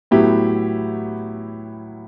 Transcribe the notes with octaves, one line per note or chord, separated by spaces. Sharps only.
A2 F#3 B3 E4 G4